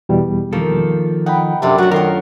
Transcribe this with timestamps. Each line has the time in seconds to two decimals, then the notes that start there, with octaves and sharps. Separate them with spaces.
0.09 E2 B2 G3
0.53 D#3 F3 A#3 A4
1.26 D#4 F#5 G5 B5
1.62 F#2 C3 D4 A4
1.78 F#3 A3 F#4
1.91 D#3 F4 F#4 A#4 C#5